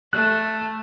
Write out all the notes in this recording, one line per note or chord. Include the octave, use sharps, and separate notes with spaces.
A3 F#6